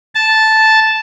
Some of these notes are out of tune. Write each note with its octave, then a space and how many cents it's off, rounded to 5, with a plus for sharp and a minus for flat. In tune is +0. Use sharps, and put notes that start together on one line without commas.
A5 -5